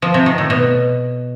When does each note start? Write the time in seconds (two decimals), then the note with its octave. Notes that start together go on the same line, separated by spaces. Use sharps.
0.02 F3
0.14 C3
0.26 D#3
0.38 A2
0.50 B2